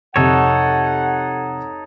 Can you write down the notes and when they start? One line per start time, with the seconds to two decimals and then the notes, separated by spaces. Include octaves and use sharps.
0.16 F2 C3 D#4 A4 C#5 F#5